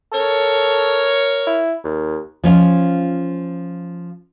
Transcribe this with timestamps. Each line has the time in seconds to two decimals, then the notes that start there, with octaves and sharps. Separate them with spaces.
0.12 A4 A#4 C#5
1.47 E4
1.84 D#2
2.44 F3 C#4 F4